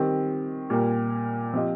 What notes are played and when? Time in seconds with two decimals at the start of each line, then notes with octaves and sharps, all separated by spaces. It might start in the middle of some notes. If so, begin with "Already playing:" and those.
Already playing: D#3 G3 C4 G4
0.70 A#2 G3 A#3 G4
1.54 F3 C4 G4 D#5